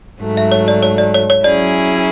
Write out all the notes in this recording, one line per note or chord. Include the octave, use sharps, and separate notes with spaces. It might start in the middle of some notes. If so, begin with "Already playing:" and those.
G#2 F#3 A3
E5
C#5
D5
C#5
D5
C#5
C#5
F#3 C#4 E4 G#4 D5